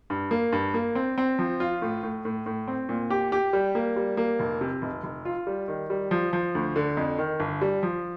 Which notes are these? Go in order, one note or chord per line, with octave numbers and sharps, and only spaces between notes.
G2
A#3
G2
A#3
C4
C4
F3
F4
A2
A2
A2
A2
C4
A#2
G4
G4
G3
A#3
G3
A#3
F1
C3
F1
F1
F4
G3
D#3
G3
F3
F3
D2
D3
F2
D#3
G1
G3
F3